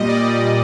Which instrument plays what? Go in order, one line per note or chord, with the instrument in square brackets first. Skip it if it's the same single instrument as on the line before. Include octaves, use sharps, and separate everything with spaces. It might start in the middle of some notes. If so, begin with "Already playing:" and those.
Already playing: [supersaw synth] A#2 G3 D#5
D5